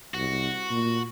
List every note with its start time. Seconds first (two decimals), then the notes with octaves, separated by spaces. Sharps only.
0.14 C2 F#4
0.71 A#2